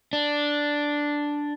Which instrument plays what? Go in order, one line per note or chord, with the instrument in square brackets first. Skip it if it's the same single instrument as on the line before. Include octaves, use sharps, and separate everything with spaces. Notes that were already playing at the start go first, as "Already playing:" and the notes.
[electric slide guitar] D4